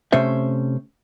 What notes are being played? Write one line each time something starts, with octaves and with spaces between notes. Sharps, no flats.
C3 A3 C#4 C5 E5